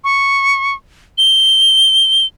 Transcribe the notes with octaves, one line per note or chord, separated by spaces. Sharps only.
C#6
G7